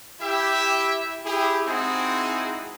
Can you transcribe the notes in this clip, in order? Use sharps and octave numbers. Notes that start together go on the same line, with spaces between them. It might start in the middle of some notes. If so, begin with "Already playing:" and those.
E4 G4 E5
E4 G4 G#4
G#3 C4 D#4 E4 F#4 G#4